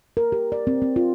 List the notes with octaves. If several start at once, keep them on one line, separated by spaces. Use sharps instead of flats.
A#4
G4
D5
C4
C4
F4